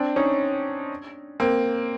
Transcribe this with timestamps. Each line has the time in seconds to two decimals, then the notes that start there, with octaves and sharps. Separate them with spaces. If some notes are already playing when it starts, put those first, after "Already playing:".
Already playing: C4 D4
0.16 C#4 D#4
1.40 A#3 C4